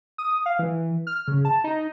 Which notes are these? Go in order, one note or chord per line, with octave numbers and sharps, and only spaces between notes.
D#6
F5
E3
F6
C#3
A5
D#4